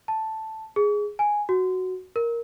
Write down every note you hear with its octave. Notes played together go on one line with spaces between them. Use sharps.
A5
G#4
G#5
F#4
A#4